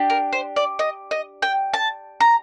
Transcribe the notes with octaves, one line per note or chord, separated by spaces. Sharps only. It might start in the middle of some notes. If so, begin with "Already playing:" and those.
Already playing: D4 G4
A#4
C5
D5
D#5
D#5
G5
A5
A#5